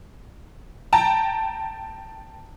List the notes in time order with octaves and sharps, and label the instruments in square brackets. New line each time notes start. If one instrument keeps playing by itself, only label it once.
[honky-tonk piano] G5 A5 A#5